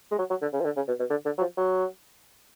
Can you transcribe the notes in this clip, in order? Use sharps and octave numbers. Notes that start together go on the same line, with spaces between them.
G#3
F#3
F#3
D3
C#3
F3
D3
C#3
B2
B2
D3
D3
F#3
F3
F#3